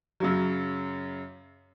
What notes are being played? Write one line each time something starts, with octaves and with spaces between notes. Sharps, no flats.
F#2 C#3 F#3